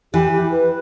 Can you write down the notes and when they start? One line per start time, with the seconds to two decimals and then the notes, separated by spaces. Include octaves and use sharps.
0.13 E3 G4
0.32 G4
0.51 B4